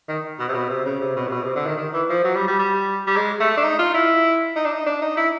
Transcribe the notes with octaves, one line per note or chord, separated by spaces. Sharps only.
D#3
B2
C3
B2
C3
C#3
C3
B2
C3
B2
C3
D3
D#3
D#3
E3
F3
F#3
G3
G3
G3
G3
G#3
A3
D4
D#4
F4
E4
D#4
D4
D#4
D4
D#4
E4